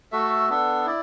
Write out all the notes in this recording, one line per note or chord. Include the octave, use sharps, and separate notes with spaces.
A3 F#4 A4 E5
B3 D4 A4
E4 D5